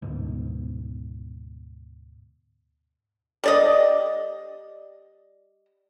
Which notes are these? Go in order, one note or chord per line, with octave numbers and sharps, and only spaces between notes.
D2 G#2 B2
G3 D5 D#5